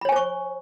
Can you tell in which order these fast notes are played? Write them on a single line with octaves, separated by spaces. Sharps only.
B5 C#5 G#5 C5 C#6